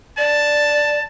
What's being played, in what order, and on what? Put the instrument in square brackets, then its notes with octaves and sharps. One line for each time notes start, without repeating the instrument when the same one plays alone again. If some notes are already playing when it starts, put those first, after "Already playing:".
[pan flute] D5 [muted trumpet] A5